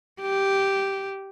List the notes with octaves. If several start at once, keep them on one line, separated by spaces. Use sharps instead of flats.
G4